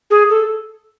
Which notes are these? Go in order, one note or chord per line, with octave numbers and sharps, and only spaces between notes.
G#4
A4